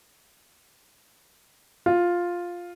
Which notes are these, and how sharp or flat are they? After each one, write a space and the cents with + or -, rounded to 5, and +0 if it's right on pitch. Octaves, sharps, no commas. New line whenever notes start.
F4 +5